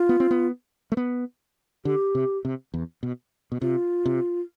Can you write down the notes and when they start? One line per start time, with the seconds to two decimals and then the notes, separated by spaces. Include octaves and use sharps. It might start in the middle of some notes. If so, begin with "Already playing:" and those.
Already playing: F4
0.09 B3
0.20 C4
0.31 B3
0.92 A3
0.97 B3
1.85 D3 G4
2.15 C3
2.45 C3
2.74 E2
3.03 B2
3.52 B2
3.61 C3 F4
4.06 C3